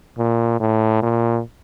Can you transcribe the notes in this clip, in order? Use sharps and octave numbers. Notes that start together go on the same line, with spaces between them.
A#2
A2
A#2